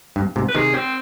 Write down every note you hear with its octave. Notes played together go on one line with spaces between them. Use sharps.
G2
G#2 C3
B4
C3 D#3 G#4
C4